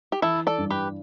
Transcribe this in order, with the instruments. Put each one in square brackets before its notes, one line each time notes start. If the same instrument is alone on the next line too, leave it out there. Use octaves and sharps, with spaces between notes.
[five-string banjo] G4
[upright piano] E3 [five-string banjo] E4 A4
[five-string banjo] A4 D5
[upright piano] G2
[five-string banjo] G4 B4